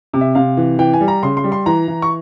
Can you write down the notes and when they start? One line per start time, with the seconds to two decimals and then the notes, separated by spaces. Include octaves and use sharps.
0.14 C3
0.21 E5
0.35 C3 F5
0.57 E3
0.79 E3 G5
0.93 G#5
1.01 G3
1.08 A#5
1.23 C#3 C6
1.37 C6
1.44 G3
1.52 C6
1.66 E3 A#5
1.88 E3
2.02 C#6